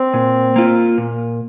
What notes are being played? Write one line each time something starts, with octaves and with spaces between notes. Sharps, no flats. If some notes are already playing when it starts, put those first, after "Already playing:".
Already playing: C4
A#2
A#3 F4
A#2